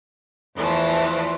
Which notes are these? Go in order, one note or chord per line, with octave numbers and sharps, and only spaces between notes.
E2 E3 F3 A3